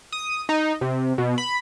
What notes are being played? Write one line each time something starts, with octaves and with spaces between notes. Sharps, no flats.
D#6
D#4
C3
B2
B5